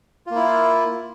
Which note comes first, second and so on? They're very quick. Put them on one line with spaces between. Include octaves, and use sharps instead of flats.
F4 A#3 E4